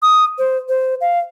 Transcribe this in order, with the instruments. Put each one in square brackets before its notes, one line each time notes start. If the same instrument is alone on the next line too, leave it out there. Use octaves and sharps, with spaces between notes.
[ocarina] D#6
C5
C5
F5